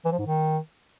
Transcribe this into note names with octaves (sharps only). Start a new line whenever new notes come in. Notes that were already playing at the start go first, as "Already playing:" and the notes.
E3
F3
G#2
D#3